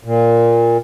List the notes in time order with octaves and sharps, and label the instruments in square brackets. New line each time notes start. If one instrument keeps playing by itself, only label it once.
[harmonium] A#2